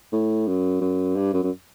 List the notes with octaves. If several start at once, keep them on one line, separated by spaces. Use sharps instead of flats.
A2
F#2
F#2
G2
F#2
F#2